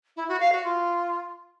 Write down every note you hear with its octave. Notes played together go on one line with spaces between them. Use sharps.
E4
F#4
F5
F#4
F4